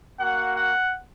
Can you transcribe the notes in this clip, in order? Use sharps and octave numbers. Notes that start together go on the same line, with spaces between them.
A#3 F#4 F#5
F#5